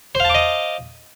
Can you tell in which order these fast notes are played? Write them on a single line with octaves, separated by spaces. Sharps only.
C5 F5 A5 D6 D#5